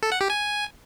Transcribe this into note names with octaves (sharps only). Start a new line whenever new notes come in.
A4
F#5
G4
G#5